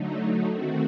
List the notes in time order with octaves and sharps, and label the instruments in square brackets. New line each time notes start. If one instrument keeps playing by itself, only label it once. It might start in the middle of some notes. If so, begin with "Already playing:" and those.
Already playing: [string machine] D3 F#3 A3 D#4
D#3 A3 C4 F#4